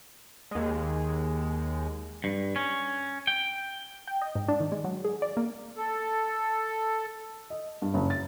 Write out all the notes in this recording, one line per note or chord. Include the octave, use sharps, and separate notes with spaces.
D#2 G#3
G2
C#4
G5
G5
D#5
G#2
D4
D#3
G#3
F#3
G#4
D5
A#3
A4
D#5
G2
F#1
A6